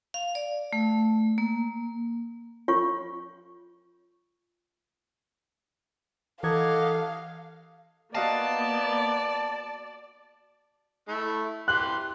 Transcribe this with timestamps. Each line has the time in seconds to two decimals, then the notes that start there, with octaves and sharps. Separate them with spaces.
0.14 F5
0.35 D5
0.73 A3
1.38 A#3
2.68 F4 C#5 C#6
6.43 E3 G4 A4 A#4 D#5 F5 F#5 G#6
8.15 A#3 B3 F#4 D5 D#5 F5 A5
11.08 A3 E4
11.68 E3 G4 C6 F#6